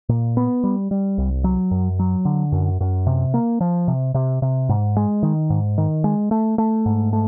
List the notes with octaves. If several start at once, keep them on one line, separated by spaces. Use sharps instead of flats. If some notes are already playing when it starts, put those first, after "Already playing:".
A#2
B3
G3
G3
C2
F#3
F#2
F#3
D3
F#2
F#2
C3
A#3
F3
C3
C3
C3
G#2
G#3
D#3
G#2
D#3
G#3
A3
A3
G#2
A3